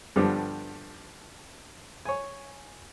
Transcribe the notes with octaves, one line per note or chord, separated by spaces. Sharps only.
G2 D3 F3 G3 B3 G4
C#5 G#5